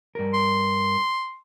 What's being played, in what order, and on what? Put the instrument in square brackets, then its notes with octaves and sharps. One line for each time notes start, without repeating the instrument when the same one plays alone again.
[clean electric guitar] G2 A#4
[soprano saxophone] C6